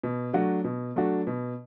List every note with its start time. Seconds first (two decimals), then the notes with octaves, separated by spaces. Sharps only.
0.04 B2
0.33 F#3 A3 D4 F#4
0.64 B2
0.96 F#3 A3 D4 F#4
1.27 B2